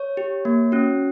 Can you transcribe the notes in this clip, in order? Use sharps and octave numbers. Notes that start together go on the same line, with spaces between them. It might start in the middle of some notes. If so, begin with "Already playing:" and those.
Already playing: C#5
G4
A#3
C#4 F#4